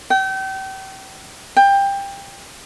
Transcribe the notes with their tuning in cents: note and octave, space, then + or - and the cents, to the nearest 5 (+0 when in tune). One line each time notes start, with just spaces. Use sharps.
G5 -35
G5 +20